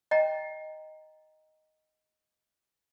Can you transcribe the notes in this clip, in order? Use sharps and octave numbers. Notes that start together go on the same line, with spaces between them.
D#5 G5 A#5